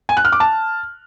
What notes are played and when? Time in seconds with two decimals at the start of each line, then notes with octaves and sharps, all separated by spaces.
0.09 G#5
0.17 F#6
0.25 F6
0.32 D6
0.40 A5